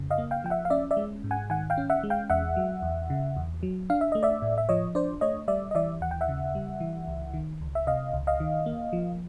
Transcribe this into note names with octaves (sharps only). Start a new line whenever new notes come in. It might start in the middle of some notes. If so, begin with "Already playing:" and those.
Already playing: F2 C#3
D#5 F5
A#3
F5 G5
F3 G5
E5 F#5
F5
C#4 D5 E5
D5 E5
G#3
G#2
F#5 G#5
D#3 F#5 G#5
F5 G5
C#4
E5 F#5
G#3
F5 G5
E2 E5 F#5
F#3
E2
C#3
E2
F#3
D4 F5
E5
A3 D#5
D5 E5
A2
E5
F3 C#5 D#5
D4 C5 D5
A3 C#5 D#5
G3 D5 E5
D#5
E3 D5 E5
D#2 F#5
G5
E5 F#5
C#3
G3
E3
C#2
D#3
C#2
E5
C3 D#5 F5
C#2
D#5 F5
D#3
A#3
F3